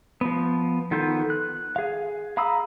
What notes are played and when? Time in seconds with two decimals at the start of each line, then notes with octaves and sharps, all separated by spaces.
0.21 F3 B3
0.91 D#3 B3 F4 A4 G6
1.30 F#6
1.76 G#4 F5
2.37 F5 A#5 B5 D#6 E6